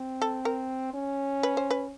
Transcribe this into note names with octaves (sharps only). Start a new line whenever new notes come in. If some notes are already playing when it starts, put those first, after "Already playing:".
Already playing: C4
A4
A#4
C#4
B4
C5
B4